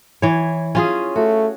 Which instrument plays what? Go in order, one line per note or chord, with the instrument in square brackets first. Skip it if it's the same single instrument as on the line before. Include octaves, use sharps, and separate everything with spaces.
[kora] E3 C#5
C#4 F4 G#4
[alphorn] A3 [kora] F#4